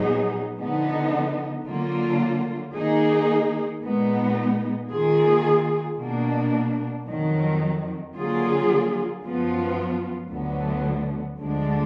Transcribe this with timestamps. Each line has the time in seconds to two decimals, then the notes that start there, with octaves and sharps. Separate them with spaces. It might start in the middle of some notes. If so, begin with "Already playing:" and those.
Already playing: A#2 F#3 B3 D#4 G#4
0.59 D3 F3 B3 D#4
1.66 D3 F#3 A#3 F4
2.74 D#3 A#3 D#4 G#4
3.82 A#2 G#3 B3 D#4
4.90 D#3 A#3 F4 G#4
5.98 B2 A#3 D4
7.06 F2 D#3 F#3
8.14 D3 F#3 A#3 F4 G#4
9.23 F#2 F3 B3 F4
10.30 D2 D3 F#3 B3
11.39 D2 D3 F3 G#3 D4